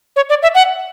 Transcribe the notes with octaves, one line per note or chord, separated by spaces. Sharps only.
C#5
D5
E5
F#5